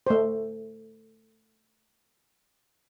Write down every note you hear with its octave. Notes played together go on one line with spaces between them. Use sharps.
A3 C5